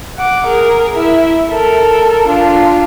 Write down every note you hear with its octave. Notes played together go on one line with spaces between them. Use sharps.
F#5 D6
G#4 A#4
E4 E5
A4 A#4
D4 F4